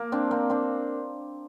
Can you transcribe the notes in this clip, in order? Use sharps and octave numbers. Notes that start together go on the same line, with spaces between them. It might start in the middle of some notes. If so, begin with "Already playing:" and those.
Already playing: A#3
C4 D4
A#3 C4
C4 D4